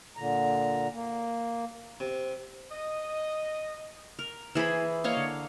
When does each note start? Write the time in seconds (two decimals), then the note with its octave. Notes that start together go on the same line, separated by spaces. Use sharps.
0.17 A#2 D3 A#5
0.93 A#3
2.00 C3
2.70 D#5
4.19 A#4
4.55 E3 G#4 C5 B5
5.04 A#3 C#5 D#5 F5
5.17 D3